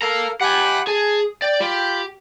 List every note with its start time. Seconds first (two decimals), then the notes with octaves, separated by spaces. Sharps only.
0.02 A4 A#4 F5 A#5
0.41 G4 F#5 G#5 B5 F#6
0.87 G#4 A5
1.42 D5 G5
1.60 F4 G4 B5